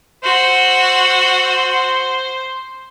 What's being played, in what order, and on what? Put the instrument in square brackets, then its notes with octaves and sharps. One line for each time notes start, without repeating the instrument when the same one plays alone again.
[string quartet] F#4 E6 [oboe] C5